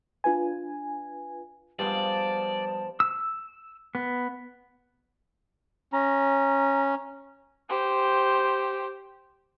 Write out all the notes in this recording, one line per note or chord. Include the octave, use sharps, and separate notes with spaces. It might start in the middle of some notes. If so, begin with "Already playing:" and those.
D4 F4 B4 G#5
G2 F3 G#3 B3 D5 A5 C6
E6
B3
C#4 A#5
G4 C5